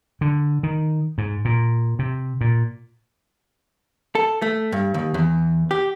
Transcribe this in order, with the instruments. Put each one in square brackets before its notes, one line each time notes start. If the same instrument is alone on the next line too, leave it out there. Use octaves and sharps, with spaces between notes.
[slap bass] D3
D#3
G#2
A#2
C3
A#2
[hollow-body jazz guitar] A4
A3
G2
D#2
E2
G4